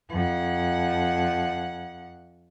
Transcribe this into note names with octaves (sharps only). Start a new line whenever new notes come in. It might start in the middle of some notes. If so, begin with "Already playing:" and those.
F2 F#5